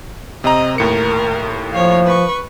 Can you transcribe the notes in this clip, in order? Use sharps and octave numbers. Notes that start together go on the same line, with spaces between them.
C3 C4 D#5 A#5
D#2 A2 A#4 C#7
F3 C#5 F5
B4 C#6